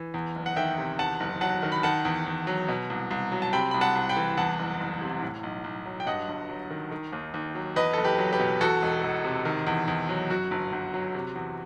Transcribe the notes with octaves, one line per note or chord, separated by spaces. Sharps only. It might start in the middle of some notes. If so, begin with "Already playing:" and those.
Already playing: E3
E2
F#1
F#5
D#3 E5 G5
C3
E2 F#5 A5
F#1
F#3 F#5 A5
D#3
B5
D#3 F#5 A5
E2
E2
F#3
B2
C2
C2
F#3
A5
C3 G5 B5
C2 B5
F#5 A5
C2
G5 B5
E3
E2 F#5 A5
F#1
F#1
C3
A2
B1
B1
F#3
G5
G2 D#5 F#5
G1
F#3
D#3
D#3
D#2
D#2
F#3
E2 B4 D#5
F#1 A4
G4 B4
F#3
G4 B4
B2
E2 F#4 A4
E1
E1
C3
D#3
E2
E2
F#3
F#2 F#4
G1
G1
F#3
C3
E2